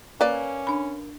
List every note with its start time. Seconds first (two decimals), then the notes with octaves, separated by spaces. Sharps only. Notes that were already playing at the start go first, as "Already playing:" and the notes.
0.21 A#3 C#4 B4 D5
0.67 D4 B5